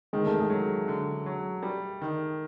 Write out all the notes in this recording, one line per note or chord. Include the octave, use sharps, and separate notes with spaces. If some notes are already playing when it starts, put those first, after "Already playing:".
D#3 G#3
A3
G#3
F#3
D3
F#3
G3
D#3